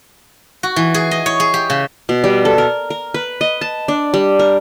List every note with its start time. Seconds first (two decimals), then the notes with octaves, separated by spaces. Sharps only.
0.63 F#4
0.76 E3
0.94 G#4
1.11 D#5
1.26 C#5
1.40 G#4
1.54 G4
1.70 C#3
2.09 B2
2.24 G3
2.45 A4
2.58 A#4
2.90 A#4
3.14 B4
3.41 D#5
3.61 A5
3.88 D4
4.14 G3
4.39 A#4